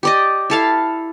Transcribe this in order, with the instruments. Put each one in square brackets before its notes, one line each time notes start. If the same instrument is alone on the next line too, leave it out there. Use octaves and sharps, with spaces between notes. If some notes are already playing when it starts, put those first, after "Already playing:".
[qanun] G4 D5 D#5
E4 A4 F5